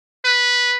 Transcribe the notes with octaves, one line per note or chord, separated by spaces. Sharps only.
B4